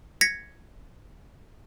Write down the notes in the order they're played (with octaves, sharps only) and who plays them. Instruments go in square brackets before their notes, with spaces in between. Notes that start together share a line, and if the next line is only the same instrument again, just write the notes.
[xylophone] G#6 A#6 B6 C#7